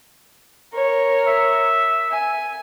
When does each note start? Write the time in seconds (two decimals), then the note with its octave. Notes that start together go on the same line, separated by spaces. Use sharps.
0.73 A#4 C#5
1.28 E5
2.11 G#5